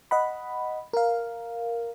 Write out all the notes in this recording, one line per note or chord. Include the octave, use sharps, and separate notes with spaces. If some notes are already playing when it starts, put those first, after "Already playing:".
D#5 F#5 B5
A#4 F5